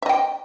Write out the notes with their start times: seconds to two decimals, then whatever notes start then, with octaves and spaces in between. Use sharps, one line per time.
0.02 E5
0.06 D#5
0.09 G5